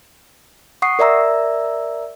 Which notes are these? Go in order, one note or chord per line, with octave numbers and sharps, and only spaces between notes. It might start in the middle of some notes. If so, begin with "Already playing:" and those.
F#5 C#6 D#6 C7
A#4 D5 E5 A#5 E6